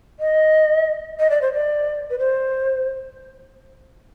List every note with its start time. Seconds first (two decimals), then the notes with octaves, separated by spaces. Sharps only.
0.20 D#5
1.20 D#5
1.30 D5
1.42 C5
1.54 D5
2.10 B4
2.19 C5